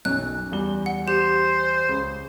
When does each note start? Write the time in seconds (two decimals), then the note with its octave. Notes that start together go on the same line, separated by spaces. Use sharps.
0.05 B1 F#2 F#6
0.52 E2 G3 G7
0.86 F#5
1.08 G4 C5
1.89 C#2